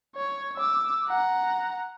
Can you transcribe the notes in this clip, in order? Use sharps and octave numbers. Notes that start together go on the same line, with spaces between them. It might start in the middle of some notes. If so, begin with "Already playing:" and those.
C#5
D6 E6
F#5 A#5